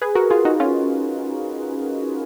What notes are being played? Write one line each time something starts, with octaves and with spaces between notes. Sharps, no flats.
G#4 B4
F#4 A#4
F4 G#4
D#4 F#4
C#4 F4